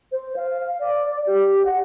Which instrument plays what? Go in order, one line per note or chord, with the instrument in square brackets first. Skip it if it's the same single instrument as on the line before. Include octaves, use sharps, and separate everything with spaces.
[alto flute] C5
F5
D5
G4
F#5